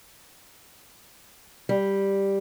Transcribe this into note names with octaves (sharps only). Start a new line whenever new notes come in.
G3